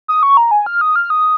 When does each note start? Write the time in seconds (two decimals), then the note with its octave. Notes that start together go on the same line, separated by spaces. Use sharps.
0.08 D#6
0.23 C#6
0.37 A#5
0.51 G#5
0.66 F6
0.81 D#6
0.96 F6
1.10 D#6